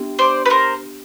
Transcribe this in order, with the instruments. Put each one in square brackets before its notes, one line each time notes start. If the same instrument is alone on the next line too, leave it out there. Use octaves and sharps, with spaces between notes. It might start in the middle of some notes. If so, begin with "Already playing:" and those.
Already playing: [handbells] B3 D4 G4
[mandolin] C5 D5
B4
A#4 C5